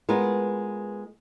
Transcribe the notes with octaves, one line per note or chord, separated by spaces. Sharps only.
G#3 B3 F4 A#4